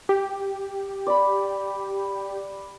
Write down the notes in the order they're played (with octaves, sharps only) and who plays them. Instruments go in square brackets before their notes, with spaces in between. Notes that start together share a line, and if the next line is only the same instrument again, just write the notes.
[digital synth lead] G4
[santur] D5 B5